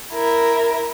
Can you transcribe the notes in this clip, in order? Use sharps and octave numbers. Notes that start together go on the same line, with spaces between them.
E4 A#4